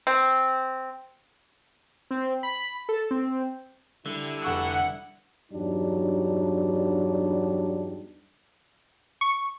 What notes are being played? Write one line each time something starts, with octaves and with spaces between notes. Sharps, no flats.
C4
C4
B5
A4
C4
D3 G3 E4
F1 F#5 C#6 E6
E2 G2 F#3 G3 D4 D#4
C#6